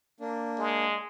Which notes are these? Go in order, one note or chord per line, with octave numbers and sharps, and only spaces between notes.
A#3 D4
G#3